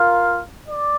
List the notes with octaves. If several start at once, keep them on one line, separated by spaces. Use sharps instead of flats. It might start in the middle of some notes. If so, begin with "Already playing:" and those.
Already playing: F4 A#4 F5
D5